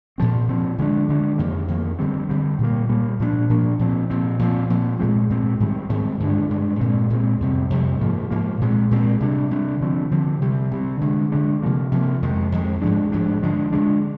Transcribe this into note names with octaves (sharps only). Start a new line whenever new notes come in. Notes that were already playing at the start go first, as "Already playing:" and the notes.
A#2 F3 C4
A#2 F3 C4
D3 G#3 D4
D3 G#3 D4
F2 D#3 A#3
F2 D#3 A#3
D3 G3 C4
D3 G3 C4
A#2 G3 A#3
A#2 G3 A#3
A#2 F3 A#3 D4
A#2 F3 A#3 D4
A#2 F3 C4
A#2 F3 C4
A#2 F3 C4
A#2 F3 C4
A#2 G#3 C4
A#2 G#3 C4
G#2 D#3 G3 C4
G#2 D#3 G3 C4
G2 D3 G#3 D4
G2 D3 G#3 D4
A#2 G#3 C4
A#2 G#3 C4
F2 C3 G3 C4
F2 C3 G3 C4
G#2 F3 A#3
G#2 F3 A#3
A#2 G#3 C4
A#2 G#3 C4
C3 G3 D4
C3 G3 D4
D3 F3 C4
D3 F3 C4
C3 G3 C4
C3 G3 C4
D3 G#3 D4
D3 G#3 D4
C3 F3 A#3
C3 F3 A#3
F2 D#3 G#3
F2 D#3 G#3
G#2 F3 G#3 D4
G#2 F3 G#3 D4
D3 F3 G#3 D4
D3 F3 G#3 D4